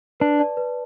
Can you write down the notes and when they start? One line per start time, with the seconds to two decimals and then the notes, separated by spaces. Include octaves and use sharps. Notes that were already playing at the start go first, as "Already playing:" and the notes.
0.20 D4 B4
0.39 D5 A5
0.57 B4